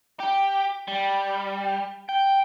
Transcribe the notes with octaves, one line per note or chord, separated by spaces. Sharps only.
G4
G3
G5